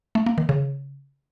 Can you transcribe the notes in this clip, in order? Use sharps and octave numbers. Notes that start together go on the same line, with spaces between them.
A3
A#3
D#3
C#3